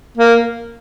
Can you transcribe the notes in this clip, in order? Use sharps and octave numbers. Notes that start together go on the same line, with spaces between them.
A#3